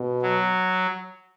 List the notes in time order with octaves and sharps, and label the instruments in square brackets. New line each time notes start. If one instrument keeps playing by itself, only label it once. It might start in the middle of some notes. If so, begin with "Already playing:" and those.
Already playing: [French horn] B2
[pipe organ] F#3